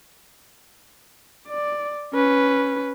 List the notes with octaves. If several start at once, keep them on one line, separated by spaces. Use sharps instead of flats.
D5
C#4 B4